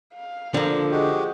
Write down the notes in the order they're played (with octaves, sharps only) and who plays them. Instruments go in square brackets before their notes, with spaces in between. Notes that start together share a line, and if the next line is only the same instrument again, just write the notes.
[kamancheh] F5
[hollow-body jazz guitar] D3 A#3 [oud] F3
[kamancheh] G#3 [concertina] F#4 G4